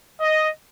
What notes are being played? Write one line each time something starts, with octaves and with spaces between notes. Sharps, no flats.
D#5